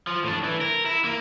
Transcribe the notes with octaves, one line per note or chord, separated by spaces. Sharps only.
F3
A2 D4
E3
A#4
E4
A#3